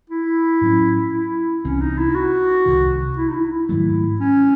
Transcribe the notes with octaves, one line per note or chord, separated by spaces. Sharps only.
E4
A2 F#3 C#4
E4
C2 C3 E3 C4 C#4
D#4
E4
F#4
C2 C3 D#3
E4
D#4
E4
E4
G#2 D#3 F#3 A3
C#4